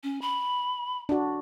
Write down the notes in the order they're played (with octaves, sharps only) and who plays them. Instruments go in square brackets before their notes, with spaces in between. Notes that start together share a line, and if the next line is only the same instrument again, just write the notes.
[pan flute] C#4
B5
[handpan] D4 F#4